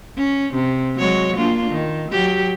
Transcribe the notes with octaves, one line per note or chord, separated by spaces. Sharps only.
C#4
C3
F#3 G#3 C#5
A#3 D4 F4
D#3
F#3 G4